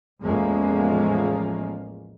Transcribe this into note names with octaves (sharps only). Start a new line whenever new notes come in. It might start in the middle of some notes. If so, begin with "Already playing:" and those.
A1 E2 F3 G#3 A#3 C#4